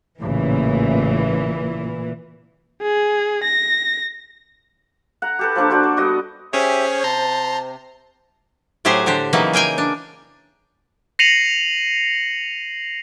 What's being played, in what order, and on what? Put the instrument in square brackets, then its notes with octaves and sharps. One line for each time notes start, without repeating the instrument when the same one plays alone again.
[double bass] A1 C#3 [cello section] A#2 E3
[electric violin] G#4
A#6
[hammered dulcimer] F#5 A#5
G4 A4 B4
F3 A#3 D4 A4
F#4 C5 D5 F#5
D5
G3 B3 F#4 D#5
[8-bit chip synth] C#4 G#4 C#5 [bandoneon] G4 E5 G#5 [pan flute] C5
[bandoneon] C3 [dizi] A5 [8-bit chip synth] A#5 C6
[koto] A2 F#3 G4 G#4 C5 G#5
D3 D4 G4 C5
C#3 E3 F#3 A#3 B3 D#4
G#4 A#4 G5 G#5
D4
[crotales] A#6 C7 C#7 D#7 F7 F#7